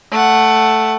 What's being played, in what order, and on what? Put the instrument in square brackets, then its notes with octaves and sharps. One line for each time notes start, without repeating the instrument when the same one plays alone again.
[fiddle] A3 F#5